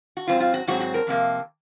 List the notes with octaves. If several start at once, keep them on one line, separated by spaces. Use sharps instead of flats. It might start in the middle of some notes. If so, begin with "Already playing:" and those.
F#4
G#2 F#3 C4 F4
F4
F#4
G#2 F#3 C4 F#4
F#4
A#4
F2 C3 A#3